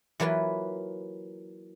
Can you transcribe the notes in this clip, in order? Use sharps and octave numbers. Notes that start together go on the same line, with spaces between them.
E3 F#3 A#3 F4 B4